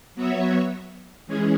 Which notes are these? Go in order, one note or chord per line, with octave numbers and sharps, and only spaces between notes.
F#3 B3 F#4 C#5 E5
E3 G#3 C#4 G#4